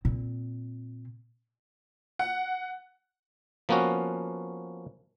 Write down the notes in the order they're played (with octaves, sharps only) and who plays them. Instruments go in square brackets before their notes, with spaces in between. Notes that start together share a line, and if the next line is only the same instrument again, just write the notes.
[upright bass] A#2 C4
[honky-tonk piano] F#5
[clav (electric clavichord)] F3 A#3 B3 C#4 F#4